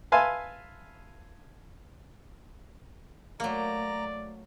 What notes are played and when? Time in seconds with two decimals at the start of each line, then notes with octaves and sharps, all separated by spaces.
0.12 B4 E5 F5 G#5 A5 C6
3.40 F#3 A3 A#3 D5 A#5